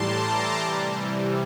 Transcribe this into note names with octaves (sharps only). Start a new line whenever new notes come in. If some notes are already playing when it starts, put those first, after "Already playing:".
Already playing: A2 E3 G3 A5 A#5 C6 D6
C3 E3 G3